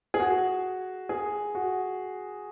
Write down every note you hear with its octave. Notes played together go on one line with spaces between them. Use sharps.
G#4
F#4
G#4
F#4